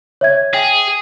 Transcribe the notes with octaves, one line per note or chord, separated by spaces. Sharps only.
C#5 E5 G#6
G#4 G5